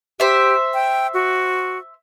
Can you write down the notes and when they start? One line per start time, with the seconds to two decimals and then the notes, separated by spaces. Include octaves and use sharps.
0.20 G4 C5 E5
0.74 G5
1.14 F#4